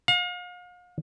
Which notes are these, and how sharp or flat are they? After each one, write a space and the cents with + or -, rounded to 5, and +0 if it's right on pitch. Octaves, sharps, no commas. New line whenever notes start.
F5 +40